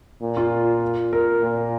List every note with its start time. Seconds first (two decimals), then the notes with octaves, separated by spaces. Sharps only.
0.22 A#2
0.37 F4
1.13 A#4
1.42 A#2